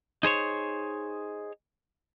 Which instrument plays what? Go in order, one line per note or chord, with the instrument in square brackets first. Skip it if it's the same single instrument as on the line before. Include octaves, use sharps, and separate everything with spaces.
[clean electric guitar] D#4 G#4 C5 C#5